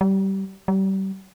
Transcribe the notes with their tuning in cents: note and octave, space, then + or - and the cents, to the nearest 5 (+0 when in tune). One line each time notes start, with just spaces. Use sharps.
G3 -20
G3 -30